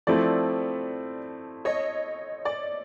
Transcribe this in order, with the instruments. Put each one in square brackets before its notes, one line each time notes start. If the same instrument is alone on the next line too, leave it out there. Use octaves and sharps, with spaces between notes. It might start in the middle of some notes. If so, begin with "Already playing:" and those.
[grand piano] F3 A3 C4 E4 A4 [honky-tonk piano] D5
[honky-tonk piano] C#5 D#5
D5